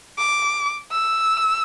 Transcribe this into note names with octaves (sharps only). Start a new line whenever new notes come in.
D6
E6